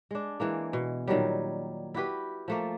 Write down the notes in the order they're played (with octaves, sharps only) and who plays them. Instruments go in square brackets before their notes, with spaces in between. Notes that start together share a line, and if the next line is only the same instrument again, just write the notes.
[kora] G#3 D4
E3 G#3 A#3
B2
A#2 D#3 F#3 G3
E4 F#4 G4 B4
F3 A3 A#3